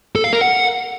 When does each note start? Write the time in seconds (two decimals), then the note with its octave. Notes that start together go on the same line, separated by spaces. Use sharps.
0.15 A4
0.24 F5
0.33 A#4
0.41 F#5